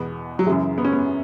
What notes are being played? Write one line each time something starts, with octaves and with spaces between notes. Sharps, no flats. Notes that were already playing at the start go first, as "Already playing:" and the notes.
Already playing: E2 B2 B3
F#3
F#2 C#3 E3 G#3
B3
C#4
B3